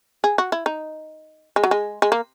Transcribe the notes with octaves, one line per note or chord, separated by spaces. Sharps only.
G#4
F#4
E4
D#4
G#3
F#3
G#3
G#3
A#3